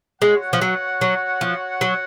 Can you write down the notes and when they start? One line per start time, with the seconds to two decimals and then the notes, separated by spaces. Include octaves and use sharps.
0.22 G#3 F#4 C#5 F#5
0.53 F3
0.61 F#3
1.01 F#3
1.41 F3
1.81 F#3